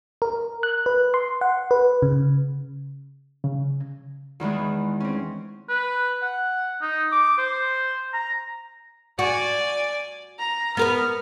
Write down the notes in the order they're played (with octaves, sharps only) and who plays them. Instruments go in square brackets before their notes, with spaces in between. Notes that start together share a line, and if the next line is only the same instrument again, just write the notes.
[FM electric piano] A#4
F#6
B4
C6
F#5
B4
C#3
[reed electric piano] C#3
[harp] E2 D#3 E3 G#3
C4 C#4
[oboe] B4
F#5
D#4
D6
C5
A#5
[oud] F#4 [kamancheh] D5 G#5
[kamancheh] A#5
[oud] B3 A#4 B4 [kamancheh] F6